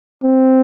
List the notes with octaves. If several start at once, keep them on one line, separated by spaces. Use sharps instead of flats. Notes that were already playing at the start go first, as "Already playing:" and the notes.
C4